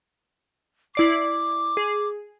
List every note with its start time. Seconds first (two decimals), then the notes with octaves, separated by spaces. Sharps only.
0.95 E4 D5 D6 C7
1.77 G#4